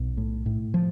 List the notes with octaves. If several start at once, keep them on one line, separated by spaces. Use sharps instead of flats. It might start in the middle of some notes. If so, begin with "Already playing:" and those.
Already playing: B1
A2
A2
F3